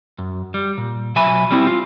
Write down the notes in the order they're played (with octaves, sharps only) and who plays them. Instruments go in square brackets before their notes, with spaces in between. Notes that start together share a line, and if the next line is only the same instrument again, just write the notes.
[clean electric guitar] F#2
G3
A#2
B1 F#3 E5 G#5 B5
G3 C4 E4
F4